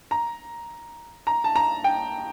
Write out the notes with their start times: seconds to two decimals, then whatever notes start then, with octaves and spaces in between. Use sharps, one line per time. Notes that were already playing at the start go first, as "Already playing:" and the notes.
0.11 A#5
1.27 A#5
1.44 A5
1.56 A#5
1.84 G5